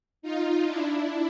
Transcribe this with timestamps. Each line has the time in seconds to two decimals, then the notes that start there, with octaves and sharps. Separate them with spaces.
0.22 D#4 F4
0.66 D4 E4